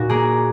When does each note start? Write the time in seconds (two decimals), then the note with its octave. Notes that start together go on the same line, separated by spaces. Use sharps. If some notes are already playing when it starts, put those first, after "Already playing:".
Already playing: A#2 D#4 F#4
0.10 A#3 G#4